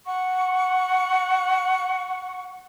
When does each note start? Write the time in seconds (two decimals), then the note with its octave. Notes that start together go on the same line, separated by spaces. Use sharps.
0.05 F#5 C#6